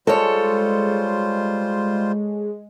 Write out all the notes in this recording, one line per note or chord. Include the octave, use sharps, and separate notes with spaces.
G3 G#3 F4 A4 C5 C#5